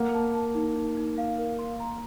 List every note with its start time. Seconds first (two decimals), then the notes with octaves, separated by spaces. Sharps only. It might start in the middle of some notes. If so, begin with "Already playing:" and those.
Already playing: A#3 F#5
0.14 A5
0.35 A5
0.55 D#4
0.75 D#4
0.97 D#4
1.18 F5
1.38 A#4
1.59 C6
1.80 A#5